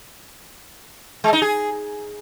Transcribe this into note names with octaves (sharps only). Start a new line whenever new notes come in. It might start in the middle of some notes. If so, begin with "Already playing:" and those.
G#3
D#4
G#4